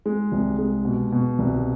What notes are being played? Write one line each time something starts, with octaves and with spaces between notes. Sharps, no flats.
G#3
C2
G#3
B2
B2
C2